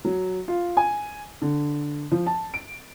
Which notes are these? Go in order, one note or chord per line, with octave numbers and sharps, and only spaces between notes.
F#3
F4
G#5
D3
F3
A5
D7